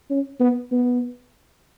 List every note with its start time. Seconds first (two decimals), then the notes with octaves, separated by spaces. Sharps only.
0.10 C#4
0.40 B3
0.72 B3